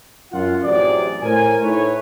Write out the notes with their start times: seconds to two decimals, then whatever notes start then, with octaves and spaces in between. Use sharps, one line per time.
0.32 F#2 F4 F#5
0.63 A1 C3 F#3 G#4 D5
1.22 A2 A#4 C5 G#5
1.63 D#4 E4 A4 B4 C#5